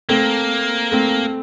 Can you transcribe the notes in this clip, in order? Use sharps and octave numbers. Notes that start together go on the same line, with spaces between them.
A3 A#3 C4
A3 C4